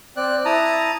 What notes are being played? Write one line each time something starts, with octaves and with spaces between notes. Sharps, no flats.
C4 D5 F#6
E4 A5 A#5 D#6